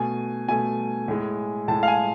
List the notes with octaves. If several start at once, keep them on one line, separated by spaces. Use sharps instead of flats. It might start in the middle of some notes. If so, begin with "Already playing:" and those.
Already playing: B2 A3 G#5
B2 A3 G#5
A2 G#3
A2 G#3 A5
F5
G#5